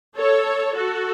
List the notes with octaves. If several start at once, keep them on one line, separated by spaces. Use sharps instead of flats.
A4 C#5
F#4 A4